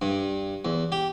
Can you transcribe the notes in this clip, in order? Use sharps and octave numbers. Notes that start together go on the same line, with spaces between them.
G2
E2
G4